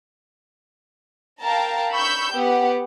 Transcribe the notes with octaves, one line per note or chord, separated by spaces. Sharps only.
A#4 F5 G5 A5 A#5
B5 C#6 E6 G6
B3 G4 F#5